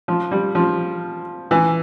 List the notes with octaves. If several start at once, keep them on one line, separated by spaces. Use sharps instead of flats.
F3
G3
F3
E3